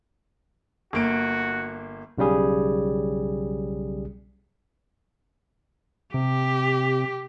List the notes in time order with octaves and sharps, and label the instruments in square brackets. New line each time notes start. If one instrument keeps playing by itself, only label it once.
[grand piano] G1 A#3 D7 [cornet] F#4
[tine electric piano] B1 C#3 G3 G#4
[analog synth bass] C3 [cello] G4